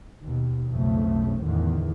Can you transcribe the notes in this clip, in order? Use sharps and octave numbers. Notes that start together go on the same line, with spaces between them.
D#2 B2
B1 F2 C#3 A3
E2 A2 D3 D#3